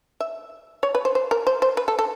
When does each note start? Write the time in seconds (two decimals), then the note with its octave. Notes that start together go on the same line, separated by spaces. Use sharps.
0.20 E5
0.83 C#5
0.95 B4
1.05 C5
1.15 C5
1.31 A#4
1.47 C5
1.62 C5
1.77 B4
1.88 A4
1.99 A4